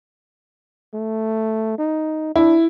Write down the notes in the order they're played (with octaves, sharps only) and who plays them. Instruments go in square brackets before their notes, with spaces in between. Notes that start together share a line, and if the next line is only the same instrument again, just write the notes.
[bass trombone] A3
D#4
[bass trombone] D4 [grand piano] E4